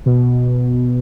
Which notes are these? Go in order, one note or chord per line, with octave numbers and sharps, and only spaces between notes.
B2